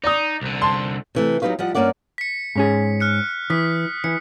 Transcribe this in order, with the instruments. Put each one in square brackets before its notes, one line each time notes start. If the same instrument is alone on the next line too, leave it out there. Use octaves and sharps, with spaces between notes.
[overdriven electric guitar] D#4 [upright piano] D5 D#6
[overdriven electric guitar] C2 D3
[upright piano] A5 C6
[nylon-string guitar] C3 E3 A3
F#3 B3 D#4 G4 B4 F5
F3 G3 D#5 F#5
G2 C#3 A#3 C#4 D5 F#5
[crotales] B6 C#7
[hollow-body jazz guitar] G#2 C#4 G#4
[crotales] F6 F#6 C#7
[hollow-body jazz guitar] E3 [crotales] D#6 B6
[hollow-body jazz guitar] E3 [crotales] C#7